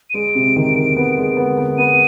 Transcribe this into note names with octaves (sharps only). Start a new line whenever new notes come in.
D#7
G#3 D7
C3
D#3
D#3
B3
G#3
B3
B3
B3 D#7